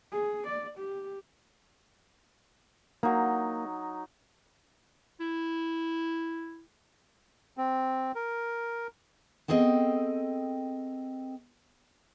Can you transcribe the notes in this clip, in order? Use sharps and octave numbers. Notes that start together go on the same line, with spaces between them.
G#4
D5
G4
F#3 A#3 D#4
E4
C4
A#4
B3 C4 G#4 A4 D#5 G5